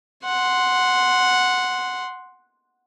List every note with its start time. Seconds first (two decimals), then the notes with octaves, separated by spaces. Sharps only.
0.25 F#5 C6